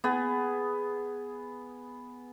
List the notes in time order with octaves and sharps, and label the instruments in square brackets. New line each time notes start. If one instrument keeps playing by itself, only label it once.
[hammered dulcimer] B3 G#4